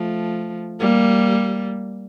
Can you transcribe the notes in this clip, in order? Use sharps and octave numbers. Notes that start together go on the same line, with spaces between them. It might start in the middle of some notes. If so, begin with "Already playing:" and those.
Already playing: F3 A3
G3 A#3